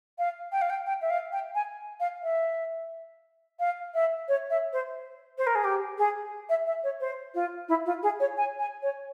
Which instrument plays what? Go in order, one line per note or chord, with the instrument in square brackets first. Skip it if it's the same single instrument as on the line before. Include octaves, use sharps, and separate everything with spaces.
[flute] F5
G5
F5
G5
G5
E5
F5
G5
G#5
F5
E5
F5
E5
C#5
E5
C5
C5
A#4
G#4
G4
G#4
E5
E5
C#5
C5
F4
E4
F4
G#4
C#5
G#5
G#5
C#5